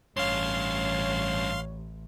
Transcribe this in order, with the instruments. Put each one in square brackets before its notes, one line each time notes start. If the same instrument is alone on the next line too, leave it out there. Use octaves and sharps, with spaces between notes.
[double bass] A1 [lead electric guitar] G2 C#4 [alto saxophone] C#5 [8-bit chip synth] F5 C6